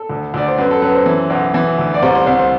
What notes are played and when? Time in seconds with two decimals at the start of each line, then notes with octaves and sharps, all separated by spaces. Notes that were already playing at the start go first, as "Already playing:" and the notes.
Already playing: A4
0.09 D2
0.34 D2 D5
0.48 C5
0.58 F#2 B4
0.71 A4
0.82 F#2 B4
0.95 C5
1.06 E3
1.30 B1
1.54 E3
1.78 D2
1.94 D5
2.02 C2 C5
2.15 C5
2.26 C2 C5
2.39 C5